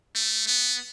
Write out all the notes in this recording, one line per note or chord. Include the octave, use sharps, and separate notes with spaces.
A3
B3